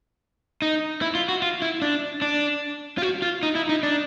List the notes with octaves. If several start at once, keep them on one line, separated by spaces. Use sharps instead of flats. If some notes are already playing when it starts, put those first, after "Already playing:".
D#4
E4
F4
F#4
F4
E4
D4
D4
F4
F#4
F4
D#4
E4
D#4
D4